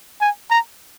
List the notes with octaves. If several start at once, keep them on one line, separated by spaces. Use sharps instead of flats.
G#5
A#5